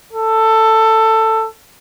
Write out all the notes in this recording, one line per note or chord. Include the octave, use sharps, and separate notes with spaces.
A4